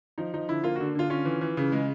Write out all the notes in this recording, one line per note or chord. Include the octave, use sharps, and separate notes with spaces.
F3 D#4
F3 D#4
D3 E4
A#3 F4
D3 F#4
D3 F4
C#4 F4
E3
E3
C#3
G#3